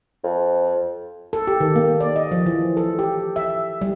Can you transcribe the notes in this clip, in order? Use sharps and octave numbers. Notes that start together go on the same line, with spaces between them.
F2
A4
G4
D#3
A#3
D5
D#5
F3
E3
A4
G4
E5
G3